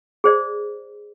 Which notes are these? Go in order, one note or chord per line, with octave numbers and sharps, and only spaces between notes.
G#4 C5 D5